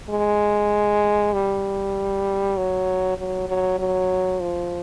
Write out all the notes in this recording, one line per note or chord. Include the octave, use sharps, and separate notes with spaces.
G#3
G3
F#3
F#3
F#3
F#3
F3